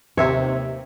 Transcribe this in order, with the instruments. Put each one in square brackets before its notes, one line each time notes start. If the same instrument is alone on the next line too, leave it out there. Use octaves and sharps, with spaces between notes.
[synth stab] D#2 C3 [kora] C#5 E5